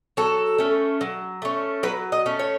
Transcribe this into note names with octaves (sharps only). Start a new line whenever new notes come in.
F#3 A4
A3 C#4
F#3
A3 C#4
F#3 B4
D#5
A3 C#4
C#5